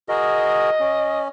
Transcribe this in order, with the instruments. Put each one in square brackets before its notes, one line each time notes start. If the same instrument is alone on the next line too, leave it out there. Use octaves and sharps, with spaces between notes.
[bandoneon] F#4 G#4 A#4 [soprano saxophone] D#5
[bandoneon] C#4